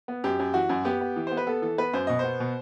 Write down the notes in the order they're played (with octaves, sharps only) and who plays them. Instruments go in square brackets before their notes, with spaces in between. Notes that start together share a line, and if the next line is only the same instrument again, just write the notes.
[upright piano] B3
F#2 G4
F#2
E3 F#4
F#2
B3 G4
B3
E3
B3 C5
B4
B3 A4
E3 A4
B3 B4
F#2 C5
B2 D#5
B3 C5
B2